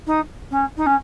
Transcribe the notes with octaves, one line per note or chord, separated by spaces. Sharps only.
D#4
C#4
D#4
C#4